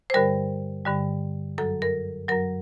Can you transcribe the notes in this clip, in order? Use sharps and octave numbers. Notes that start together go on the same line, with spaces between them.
C5
G2 D3 G3 A#4
G2 D3 G3
F#2 F#3 A4
A#4
F#2 F#3 A#4